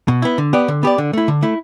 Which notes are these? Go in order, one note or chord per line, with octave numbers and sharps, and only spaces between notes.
B2
B3 E4
D3
B3 G4 D5
D3
B3 G4 D5
D3
A3 E4
D3
A3 E4